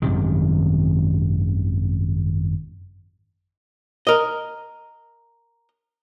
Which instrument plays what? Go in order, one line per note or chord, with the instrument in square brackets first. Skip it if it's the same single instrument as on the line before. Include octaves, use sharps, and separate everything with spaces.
[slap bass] G#1 F#2 C3 D#3
[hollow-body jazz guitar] A#4 D#5